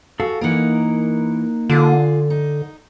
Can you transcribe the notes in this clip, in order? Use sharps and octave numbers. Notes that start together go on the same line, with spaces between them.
F#4 G#4 A4 F5
E3 A#3 D#4 A#4 F#5
D3 F4 G#4
D#4